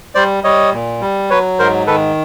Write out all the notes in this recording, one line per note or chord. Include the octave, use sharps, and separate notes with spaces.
G3 C5 D5
G3 C#5 D#5
A#2
G3
F#3 B4 C#5
G#2 A#4 C5
D#3 A4 B4